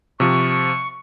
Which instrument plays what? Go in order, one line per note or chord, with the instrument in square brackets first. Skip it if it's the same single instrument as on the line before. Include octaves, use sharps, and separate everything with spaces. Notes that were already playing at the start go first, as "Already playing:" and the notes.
[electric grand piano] C3 F3 [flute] C#6